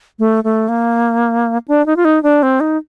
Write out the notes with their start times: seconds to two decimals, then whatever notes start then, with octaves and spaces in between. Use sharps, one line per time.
0.19 A3
0.44 A3
0.69 A#3
1.68 D4
1.86 D#4
1.96 F4
2.05 D#4
2.23 D4
2.43 C4
2.60 D#4